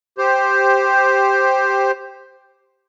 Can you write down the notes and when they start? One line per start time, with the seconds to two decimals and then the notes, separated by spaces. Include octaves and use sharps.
0.18 G4 C5